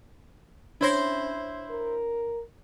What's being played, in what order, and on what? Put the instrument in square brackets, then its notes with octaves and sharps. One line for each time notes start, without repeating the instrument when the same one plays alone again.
[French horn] C#4 [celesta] D4 C#5 A#6 [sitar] E4 C5
[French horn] A#4